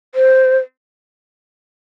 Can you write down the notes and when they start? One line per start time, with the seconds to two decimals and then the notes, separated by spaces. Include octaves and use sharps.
0.15 C5